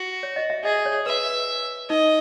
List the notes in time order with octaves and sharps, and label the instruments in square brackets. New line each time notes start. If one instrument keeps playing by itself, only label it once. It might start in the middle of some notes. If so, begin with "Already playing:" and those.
Already playing: [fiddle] F#4
[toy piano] C#5
D#5
E5
[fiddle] G#4 [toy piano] D#5
[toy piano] C#5
[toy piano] B4 [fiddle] E5
[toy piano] D#4 [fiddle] D#5